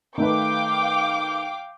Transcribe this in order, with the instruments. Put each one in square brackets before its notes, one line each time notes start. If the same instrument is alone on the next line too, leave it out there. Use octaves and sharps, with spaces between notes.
[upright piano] D#3 A3 B4 [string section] F5 G5 D6